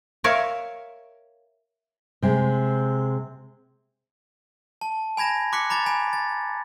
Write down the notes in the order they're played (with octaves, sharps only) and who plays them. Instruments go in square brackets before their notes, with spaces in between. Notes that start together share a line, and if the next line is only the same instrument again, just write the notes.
[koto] A#4 C#5 E5 F5
[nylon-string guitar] C3 G#3
[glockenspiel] A5
G#5 B5 G#6 A#6 E7
C6 D6 F#6 B6 C#7
A#5 B5 D6 A6
G#5 B5
A6